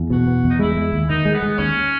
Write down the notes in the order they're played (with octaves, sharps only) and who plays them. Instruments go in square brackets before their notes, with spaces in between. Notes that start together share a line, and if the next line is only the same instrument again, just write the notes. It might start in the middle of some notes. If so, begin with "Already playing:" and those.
Already playing: [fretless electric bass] E2
[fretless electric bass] B2 [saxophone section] F#4
[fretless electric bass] B3
[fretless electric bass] E2 [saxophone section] D#4
[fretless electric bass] G#3 [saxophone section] E4
[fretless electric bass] G#3
D#2
[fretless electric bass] D#3 [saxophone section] D#4
[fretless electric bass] G#3
[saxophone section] B3
[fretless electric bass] G#3
[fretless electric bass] D#2 [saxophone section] C#4